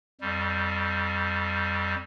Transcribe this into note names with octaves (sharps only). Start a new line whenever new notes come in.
F2 G3